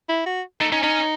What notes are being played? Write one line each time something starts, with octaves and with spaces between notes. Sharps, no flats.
E4
F#4
A3 D#4
C#4 D#4
C#4 D#4